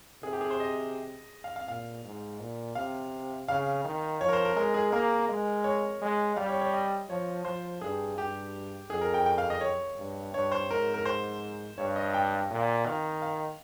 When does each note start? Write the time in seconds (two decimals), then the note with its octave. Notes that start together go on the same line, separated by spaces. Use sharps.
0.23 C3 G#4
0.33 G4
0.41 G#4
0.50 C5
0.60 D#5
1.44 F5
1.56 F5
1.68 A#2 F5
2.04 G#2
2.40 A#2
2.75 C3 F5
3.48 C#3 F5
3.85 D#3
4.21 F3 C#5
4.29 A#4
4.33 C5
4.45 A#4
4.56 G#3 A#4
4.74 G#4
4.92 A#3 A#4
5.28 G#3
5.64 C#5
6.01 G#3
6.36 G3 F5
6.49 C#5
6.61 C#5
6.73 D#5
7.10 F3 C#5
7.45 F3 C5
7.81 G2 G#4
8.17 G2 G4
8.90 F2 G#4
9.01 A#4
9.14 G5
9.26 G5
9.38 F5
9.50 D#5
9.61 C#5
9.98 G2
10.33 G2 C#5
10.52 C5
10.70 G#2 A#4
10.94 A#4
11.05 C5
11.77 G2 C#5
11.96 D#5
12.14 G5
12.50 A#2
12.86 D#3 F5
13.22 F5